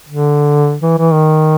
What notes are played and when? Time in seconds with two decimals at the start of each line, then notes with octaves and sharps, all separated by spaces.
0.08 D3
0.82 E3
0.98 E3
1.13 D#3